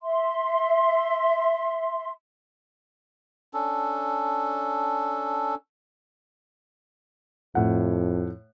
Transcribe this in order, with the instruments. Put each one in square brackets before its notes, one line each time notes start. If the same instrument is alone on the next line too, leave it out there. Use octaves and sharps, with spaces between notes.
[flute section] E5 C6
[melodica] C#4 D4 A4
[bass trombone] F2 [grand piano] A2 F#5